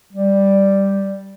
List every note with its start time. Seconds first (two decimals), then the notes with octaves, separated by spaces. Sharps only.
0.13 G3